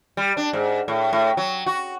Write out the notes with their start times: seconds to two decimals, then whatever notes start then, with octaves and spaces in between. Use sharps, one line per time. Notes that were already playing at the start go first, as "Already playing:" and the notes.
0.17 G3
0.37 D4
0.53 G#2
0.88 A2
1.13 A2
1.37 F#3
1.66 F#4